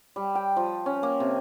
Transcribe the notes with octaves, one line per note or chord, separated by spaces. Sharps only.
G3
G5
F3
C#4
A#3
C3